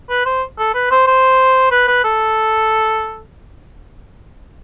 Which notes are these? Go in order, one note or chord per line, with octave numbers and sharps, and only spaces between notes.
B4
C5
A4
B4
C5
C5
B4
B4
A4